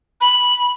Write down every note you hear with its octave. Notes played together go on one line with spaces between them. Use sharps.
B5